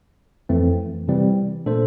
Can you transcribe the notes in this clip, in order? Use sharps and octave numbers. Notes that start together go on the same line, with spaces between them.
F2 E3 A3 C4
C3 E3 G3 C4
A#2 A3 D4 A4 C5